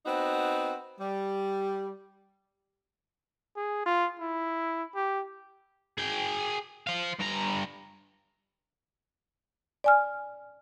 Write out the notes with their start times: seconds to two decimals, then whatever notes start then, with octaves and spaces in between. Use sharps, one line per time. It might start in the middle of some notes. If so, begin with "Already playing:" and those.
0.06 B3 C4 D#4 F#4
1.00 G3
3.56 G#4
3.86 F4
4.20 E4
4.95 G4
5.98 G#4 G5
6.87 C5 F5
7.19 G2 A#5
9.84 D5 G#5 F6